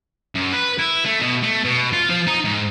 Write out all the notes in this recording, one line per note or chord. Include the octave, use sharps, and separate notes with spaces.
F#2
B4
E4
A3
B2
A3
B2
F4
F3
D#4
G#2